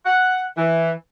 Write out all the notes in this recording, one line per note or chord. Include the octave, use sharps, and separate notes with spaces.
F#5
E3